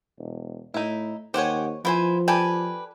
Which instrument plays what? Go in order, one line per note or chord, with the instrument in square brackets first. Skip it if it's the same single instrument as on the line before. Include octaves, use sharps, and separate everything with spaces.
[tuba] E1
[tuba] A2 [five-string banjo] D#4 E4
[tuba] D#2 [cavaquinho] G4 F#5 G#5 [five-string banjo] C5 C#5
[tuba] F3 [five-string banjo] B3 [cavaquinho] E4 C5 G#5
[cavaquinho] G4 B4 G#5 [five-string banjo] A4 D5 G5